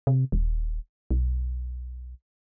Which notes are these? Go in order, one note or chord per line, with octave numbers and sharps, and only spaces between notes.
C3
D#1
B1